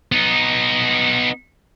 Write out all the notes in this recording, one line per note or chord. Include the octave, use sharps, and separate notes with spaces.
B3 D#4